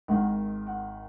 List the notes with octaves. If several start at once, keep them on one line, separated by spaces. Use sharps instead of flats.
G#1 G#2 D#3 F#5
F#5